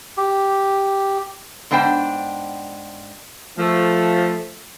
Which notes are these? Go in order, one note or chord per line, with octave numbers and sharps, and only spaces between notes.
G4
G#2 B3 D4 C5 G5
F3 A3